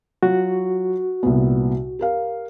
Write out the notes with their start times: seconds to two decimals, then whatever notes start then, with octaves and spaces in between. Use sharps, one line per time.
0.23 F#3 F4 F#4
1.23 C2 A#2 B3
1.99 G4 A#4 F5